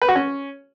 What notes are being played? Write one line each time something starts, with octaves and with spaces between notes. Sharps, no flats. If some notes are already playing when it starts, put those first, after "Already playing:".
B4
F#4
C#4